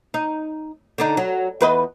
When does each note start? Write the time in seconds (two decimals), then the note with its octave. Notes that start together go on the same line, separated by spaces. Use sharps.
0.14 D#4
0.98 D3 D4 D#4
1.17 F#3
1.61 E2 B4 D#5